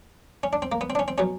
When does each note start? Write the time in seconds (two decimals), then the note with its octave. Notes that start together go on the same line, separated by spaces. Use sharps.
0.43 C#4
0.53 D4
0.62 C4
0.72 A#3
0.81 B3
0.90 C4
0.95 D4
0.99 C#4
1.08 C4
1.18 B2 F#3 C#4